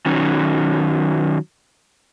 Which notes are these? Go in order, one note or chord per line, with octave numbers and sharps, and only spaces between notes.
D#3 F#3 C#4 D#4